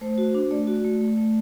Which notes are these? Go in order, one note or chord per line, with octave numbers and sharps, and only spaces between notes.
A3 C5
F#4
D4
A3 D5
F#4
A3
A3
A3